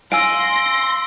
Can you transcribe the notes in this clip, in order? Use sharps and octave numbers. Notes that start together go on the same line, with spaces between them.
F5 G#5 C6 E6 A#6 D7